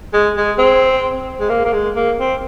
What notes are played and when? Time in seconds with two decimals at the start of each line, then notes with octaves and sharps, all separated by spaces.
0.14 G#3
0.37 G#3
0.59 C4
1.40 G#3
1.50 A#3
1.65 A#3
1.73 G#3
1.96 A#3
2.18 C4